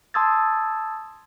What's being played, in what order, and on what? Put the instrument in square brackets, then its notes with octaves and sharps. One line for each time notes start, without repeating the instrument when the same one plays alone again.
[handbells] A5 C6 D#6 E6 G#6 A6